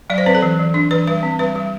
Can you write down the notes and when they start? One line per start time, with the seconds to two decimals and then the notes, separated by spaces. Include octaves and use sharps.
0.10 F#3 D5
0.18 C5
0.26 C4 B4
0.35 A4
0.42 E3
0.59 E3
0.74 D4
0.91 E3 B4
1.07 G3 B4
1.23 C4
1.39 G3 B4
1.55 G3